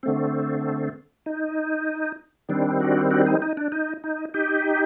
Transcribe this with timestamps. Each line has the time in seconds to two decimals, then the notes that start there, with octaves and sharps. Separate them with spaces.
0.03 D3 A3 C4
1.26 D#4
2.49 D#3 G3 C4 D4
2.80 D4 F#4
3.11 D4 F#4
3.26 D#4
3.42 D#4
3.57 D4
3.72 D#4
4.04 D#4
4.34 D#4 G4